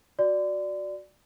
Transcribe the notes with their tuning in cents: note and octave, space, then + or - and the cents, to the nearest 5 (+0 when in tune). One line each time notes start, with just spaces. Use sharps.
F#4 -5 D5 +0 C6 -40